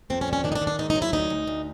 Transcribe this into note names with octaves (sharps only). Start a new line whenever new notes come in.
F2 C4
C#4
D3
C#4
D#3 D4
D#4
D4
D#3
D4
G#2 D#4
D#4
F#3
E4
D2 D#4
D2
D2